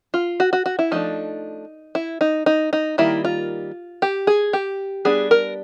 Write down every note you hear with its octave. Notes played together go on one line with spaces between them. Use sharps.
F4
F#4
F#4
F#4
E4
F3 A3 D4 D#4
E4
D#4
D#4
D#4
D#3 G3 A#3 E4
F4
G4
G#4
G4
G3 B3 D4 G#4
A#4